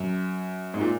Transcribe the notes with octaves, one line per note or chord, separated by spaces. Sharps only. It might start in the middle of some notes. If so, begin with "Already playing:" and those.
Already playing: F#2
G#2
A#2